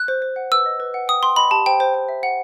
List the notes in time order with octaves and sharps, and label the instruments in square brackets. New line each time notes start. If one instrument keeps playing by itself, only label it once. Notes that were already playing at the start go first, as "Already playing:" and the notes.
Already playing: [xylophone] F#6
C5
C5
F#5
B4 E6
D#5
B4
F#5
G5 D#6
G5 C6
D#5 B5
G4 A5
C5 G5
C5
G5
E5
F#5